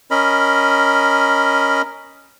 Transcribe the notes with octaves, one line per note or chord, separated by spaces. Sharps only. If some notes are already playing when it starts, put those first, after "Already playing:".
C#4 A#4 D#5 B5